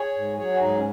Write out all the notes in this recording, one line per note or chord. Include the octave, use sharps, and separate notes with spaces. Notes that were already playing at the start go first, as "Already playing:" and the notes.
Already playing: G#4 C#5
G#2
F#3 G#4 C#5
F#4
G#2 D#4 G#4
C#4